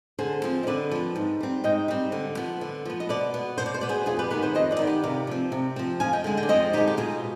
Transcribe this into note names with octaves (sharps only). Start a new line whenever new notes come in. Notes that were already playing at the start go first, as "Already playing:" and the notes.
D3 G#4 C5
F3 C4
D#5
D3 B4 D5
F3 C4
G#2
G3 C4
G#2 D#5 G5
G3 C4
D3
F3 B3
D3
F3 B3
D#5
B2 B4 D5
B3
B2 C5
D5
C5
B3 D5
G#4 C5
F2 F4 G#4
G4 B4
D#3 B3 G4 B4
G#4 C5
F2 C5 D#5
B4 D5
D#3 B3
G4 B4
C3 D5 F5
F3 C4
C3
F3 C4
F2 F5 G#5
D#5 G5
D3 G#3
D#5 G5
D5
F2 C5 D#5
D3 G#3 D#4 G4
G4
B2 F4 G#4